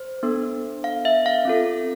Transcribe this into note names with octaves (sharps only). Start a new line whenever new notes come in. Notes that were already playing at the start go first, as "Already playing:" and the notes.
Already playing: C5
B3 D4 A4
F5
E5
F5
C4 F4 A4